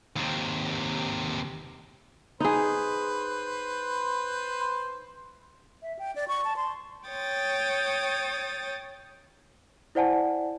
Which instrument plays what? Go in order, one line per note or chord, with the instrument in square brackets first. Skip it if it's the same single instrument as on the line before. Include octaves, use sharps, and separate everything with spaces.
[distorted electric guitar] D#2 C3
[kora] D#4 G#4 [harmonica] B4 C5
[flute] E5
G5
D5
C#6
A5
C6
[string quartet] C#5 G5 D#6 A6
[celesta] E4 C5 D5 F#5 G#5 A5